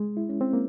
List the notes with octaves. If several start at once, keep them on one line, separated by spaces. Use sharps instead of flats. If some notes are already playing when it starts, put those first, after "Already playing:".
Already playing: G#3
E4
C#4
C4
A#3